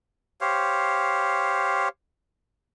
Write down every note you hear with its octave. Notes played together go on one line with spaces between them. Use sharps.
G4 C5 C#5 F5